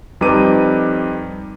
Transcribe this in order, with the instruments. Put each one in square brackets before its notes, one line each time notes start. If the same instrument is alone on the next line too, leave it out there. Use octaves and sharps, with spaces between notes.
[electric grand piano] F2 G3 D#4 B4 D6 D#7